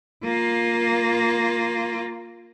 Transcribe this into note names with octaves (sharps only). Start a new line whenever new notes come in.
A#3 F4